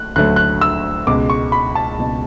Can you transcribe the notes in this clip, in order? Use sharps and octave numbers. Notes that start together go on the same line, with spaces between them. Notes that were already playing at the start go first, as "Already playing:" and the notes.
Already playing: A3 F#6
D2 D3 F#3 A3 F#6
F#6
E6
C#2 B2 G#3 D6
C#6
B5
A5
C#2 B2 G#3